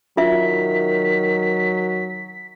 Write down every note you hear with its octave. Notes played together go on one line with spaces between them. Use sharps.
D#3 F#3 F4 E5 B6